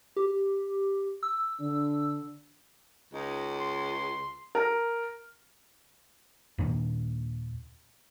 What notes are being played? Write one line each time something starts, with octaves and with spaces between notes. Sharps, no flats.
G4
E6
D3 D4
C#2 D#4
C6
A#4
D#2 A#2 D4